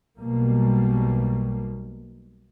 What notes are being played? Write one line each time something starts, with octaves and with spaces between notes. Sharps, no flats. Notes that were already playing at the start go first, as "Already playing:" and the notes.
B1 B2 G3 A#3